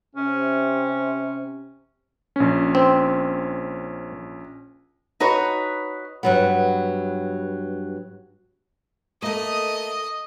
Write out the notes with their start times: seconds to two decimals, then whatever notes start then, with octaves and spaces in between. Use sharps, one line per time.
0.15 C3 C#4
2.36 A#1 C#4
2.75 C4
5.20 D#4 F#4 B4 C#5
6.23 G2 F#3 B3
9.22 A3 A#3 D#5